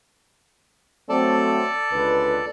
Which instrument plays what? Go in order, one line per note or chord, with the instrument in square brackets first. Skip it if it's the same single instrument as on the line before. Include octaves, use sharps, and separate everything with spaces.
[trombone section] F#3 A3 C4 [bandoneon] A4 D5 A5
[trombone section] C#2 D3 B4